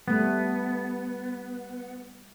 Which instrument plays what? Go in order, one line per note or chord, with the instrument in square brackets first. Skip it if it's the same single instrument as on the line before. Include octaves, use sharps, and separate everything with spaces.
[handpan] G3 A3 [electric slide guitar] B3